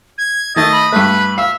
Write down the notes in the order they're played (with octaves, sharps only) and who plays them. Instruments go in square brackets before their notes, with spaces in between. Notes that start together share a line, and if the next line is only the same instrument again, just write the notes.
[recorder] G#6
[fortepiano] D#3 A3 [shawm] D#5 [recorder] A6
[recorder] B5
[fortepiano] G2 A3 [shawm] B4
[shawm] E5 [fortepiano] F5